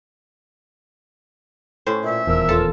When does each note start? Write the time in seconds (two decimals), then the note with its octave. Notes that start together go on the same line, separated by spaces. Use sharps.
1.87 A2 C#4 C5
2.04 A#2 E5
2.27 D#1 E2 F3 A#4 E6
2.49 F4 A4